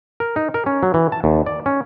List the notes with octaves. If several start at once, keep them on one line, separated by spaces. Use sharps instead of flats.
A#4
D#4
A#4
C#4
F#3
E3
A5
D#2
D5
C#4